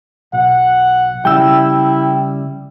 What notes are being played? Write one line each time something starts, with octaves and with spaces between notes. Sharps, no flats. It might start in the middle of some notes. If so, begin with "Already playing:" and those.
B1 F#5
C#3 G3 E4 G5 E6